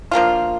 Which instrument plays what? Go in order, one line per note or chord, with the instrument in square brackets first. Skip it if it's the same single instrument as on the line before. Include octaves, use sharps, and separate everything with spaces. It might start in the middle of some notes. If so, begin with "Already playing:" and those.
[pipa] F3 A#3 D4 F4